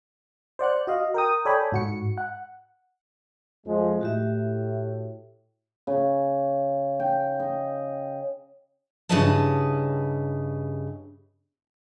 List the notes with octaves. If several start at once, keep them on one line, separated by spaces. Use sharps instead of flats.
C5 D5 F#5 F#6
F#4 D#5 F5
A#4 G5 D#6
A4 C#5 D5 G5 G#5 B5
G#2 F#4 C#7
F#5
F2 F3 G#3
A2 F#4 G4 E5
C#3
G5
D#5
G2 C#3 E4 B4 D#5 A5